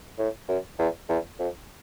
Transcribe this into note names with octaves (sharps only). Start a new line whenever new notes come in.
A2
F#2
E2
E2
F2